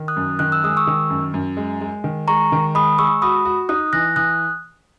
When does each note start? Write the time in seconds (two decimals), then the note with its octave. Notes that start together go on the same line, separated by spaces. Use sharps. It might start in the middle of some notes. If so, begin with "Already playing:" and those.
Already playing: D#3
0.08 D#6 F#6
0.16 F#2
0.39 D#3 F#6
0.52 E6
0.64 G#3 D#6
0.77 C#6 E6
0.87 D#3
1.10 F#2
1.34 F#2
1.57 G#3
1.81 G#3
2.04 D#3
2.28 G#3 A#5 C#6
2.52 D#3
2.75 G#3 B5 D#6
2.98 G#3 C#6 E6
3.22 F#4 B5 D#6
3.45 F#4
3.69 D#4 D#6 F#6
3.93 E3 F#6 A#6
4.16 E3 D#6 F#6